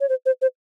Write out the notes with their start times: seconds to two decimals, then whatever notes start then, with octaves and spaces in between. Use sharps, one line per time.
0.01 C#5
0.09 C5
0.26 C5
0.42 C5